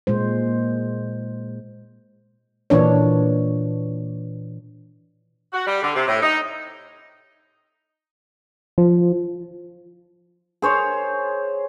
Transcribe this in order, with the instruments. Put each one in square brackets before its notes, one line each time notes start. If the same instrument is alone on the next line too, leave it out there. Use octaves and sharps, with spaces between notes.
[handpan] A#2 G#3 C5
A#2 E3 D4 C#5
[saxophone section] F#4
G3
D3
C3
A2
D#4
[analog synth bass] F3
[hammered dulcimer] G#4 C5 C#5